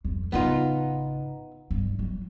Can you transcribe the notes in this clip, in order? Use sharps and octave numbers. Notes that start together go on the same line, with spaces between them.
F2
A1 C#3 B3 D#4 F4
G2
F#3